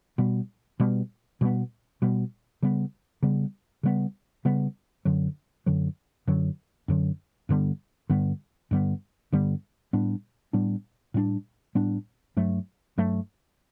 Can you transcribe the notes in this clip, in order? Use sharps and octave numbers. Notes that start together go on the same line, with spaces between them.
B2 G3 B3
B2 G3 B3
B2 G3 B3
B2 G3 B3
C#3 G3 B3
C#3 G3 B3
C#3 G3 B3
C#3 G3 B3
F#2 D3 F#3
F#2 D3 F#3
F#2 D3 F#3
F#2 D3 F#3
G2 D3 G3 B3
G2 D3 G3 B3
G2 D3 G3 B3
G2 D3 G3 B3
A2 G3 B3 D4
A2 G3 B3 D4
A2 G3 B3 D4
A2 G3 B3 D4
G2 F#3 A3
G2 F#3 A3